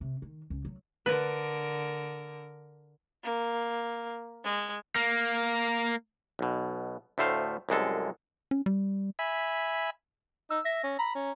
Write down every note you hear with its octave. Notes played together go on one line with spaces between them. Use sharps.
C3
D#3
C#2
F#3
D3 A#4 B4
A#3
G#3
A#3
B1 B2
D2 A2 A3 C5 F5
C2 F#2 G#3 A4
C#4
G3
E5 G#5 B5
D#4 E6
E5 A#6
C#4
A#5 B5
C#4